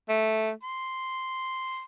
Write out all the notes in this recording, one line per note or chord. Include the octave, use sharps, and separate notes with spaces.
A3
C6